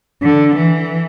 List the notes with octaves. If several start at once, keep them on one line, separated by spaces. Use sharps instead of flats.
D3
E3